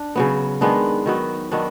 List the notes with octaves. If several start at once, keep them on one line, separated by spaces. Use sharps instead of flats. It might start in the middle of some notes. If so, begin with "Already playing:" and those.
Already playing: D4
C#3 F#3 B3
D#3 G#3 B3 D4
D#3 F#3 B3
D#3 F#3 B3 D4